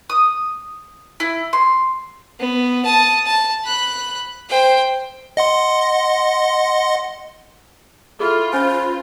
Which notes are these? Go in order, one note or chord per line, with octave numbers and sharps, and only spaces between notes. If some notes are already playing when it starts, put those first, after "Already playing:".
D#6
E4
C6
B3
A5 D#6
A5
B5 F#6
C5 G5
D#5 F#5 C6
E4 F4 G#4 A4
C#4 B4 C5 G#5